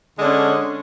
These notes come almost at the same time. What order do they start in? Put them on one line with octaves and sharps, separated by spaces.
G#3 D3 D4 C#4